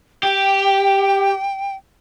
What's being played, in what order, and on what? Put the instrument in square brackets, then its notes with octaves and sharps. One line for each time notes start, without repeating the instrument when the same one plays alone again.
[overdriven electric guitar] G4 [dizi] G5